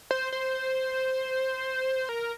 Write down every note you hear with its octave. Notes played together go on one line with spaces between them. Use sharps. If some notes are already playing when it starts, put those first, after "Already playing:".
C5
C5
A#4